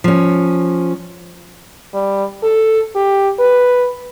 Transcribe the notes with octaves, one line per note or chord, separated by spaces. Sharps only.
F3 C#4
G3
A4
G4
B4